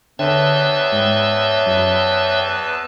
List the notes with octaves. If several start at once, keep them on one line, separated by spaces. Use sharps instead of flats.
E2 D3 B4 C#5 E5 G5 A5
G#2
F#2